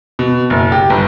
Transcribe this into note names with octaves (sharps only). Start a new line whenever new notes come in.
B2
F#1
G4
G1